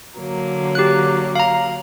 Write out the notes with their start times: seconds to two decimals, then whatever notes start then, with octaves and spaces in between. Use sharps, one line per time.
0.19 D3 F#3 A#3
0.75 G4 F#6
1.35 F5 A#5